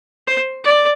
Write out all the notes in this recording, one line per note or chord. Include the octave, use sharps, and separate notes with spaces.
C5
D5